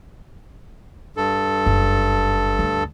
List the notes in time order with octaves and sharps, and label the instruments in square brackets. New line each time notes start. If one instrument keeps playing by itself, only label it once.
[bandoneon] G2 A4
[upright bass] F#1
D2